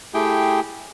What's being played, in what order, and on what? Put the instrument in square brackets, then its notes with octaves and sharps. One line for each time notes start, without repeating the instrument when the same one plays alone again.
[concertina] A3 E4 G4 G#4 G5